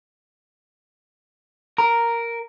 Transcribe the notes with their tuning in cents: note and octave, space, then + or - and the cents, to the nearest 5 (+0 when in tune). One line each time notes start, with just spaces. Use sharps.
A#4 +0 A#5 +0